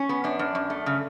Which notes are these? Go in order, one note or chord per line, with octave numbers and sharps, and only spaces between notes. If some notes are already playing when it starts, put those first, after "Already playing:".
Already playing: C#4
B3
F#2 D4
F#2
F#2
A3
C#3